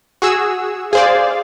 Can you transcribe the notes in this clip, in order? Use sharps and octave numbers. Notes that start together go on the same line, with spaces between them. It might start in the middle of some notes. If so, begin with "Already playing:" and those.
F#4 G#4 E6
G#4 C5 D5 F5